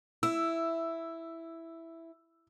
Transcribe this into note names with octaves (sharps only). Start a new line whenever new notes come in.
E4 E6